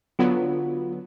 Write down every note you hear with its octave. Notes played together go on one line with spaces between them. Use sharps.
D3 F#3 B3 F4